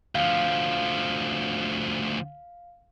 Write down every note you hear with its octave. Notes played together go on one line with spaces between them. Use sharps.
D2 F3 F5